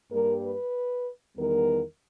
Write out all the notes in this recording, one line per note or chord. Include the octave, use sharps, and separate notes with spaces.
G2 G3 A#3 A#4
B4
E2 D#3 G3 B3 A#4